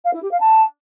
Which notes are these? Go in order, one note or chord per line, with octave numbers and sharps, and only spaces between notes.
F5
E4
G4
F5
A5